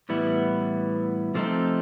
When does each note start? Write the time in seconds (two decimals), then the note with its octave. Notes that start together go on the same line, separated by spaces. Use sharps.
0.09 A2 E3 G3 B3 E4
1.35 C3 F3 A3 C4 D#4